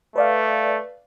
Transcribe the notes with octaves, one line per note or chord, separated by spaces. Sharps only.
A3 B4 D5 F5